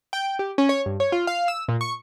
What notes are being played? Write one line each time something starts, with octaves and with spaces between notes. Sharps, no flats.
G5
G4
C#4
C#5
G2
C#5
F4
F5
E6
A#2
C#6